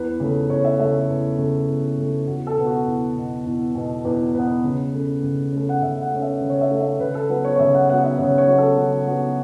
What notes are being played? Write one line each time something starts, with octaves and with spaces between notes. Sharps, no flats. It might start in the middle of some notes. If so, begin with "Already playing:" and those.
Already playing: E2 B4
C#3 A3
E2 C#5
E5
C#3 A3 E5
A4
E2
C#3 A3
E2
C#3 A3
E2 F#4
A4
B2 B3
F#4
E2
B2 B3
E2
B2 B3
E2 B4
B2 B3 B4
C#3
A3 C#4
C#3
A3 C#4
F#5
C#3 E5
F#5
A3 C#4
E5
C#3
C#5
E5
A3 C#4
E5
C#3 B4
A4
F#3 B3 B4
C#5
C#5
C#3 E5
F#5
F#3 B3 F#5
E5
C#3 C#5
C#5
F#3 B3
A4
C#3 F#4
F#3 B3 F#4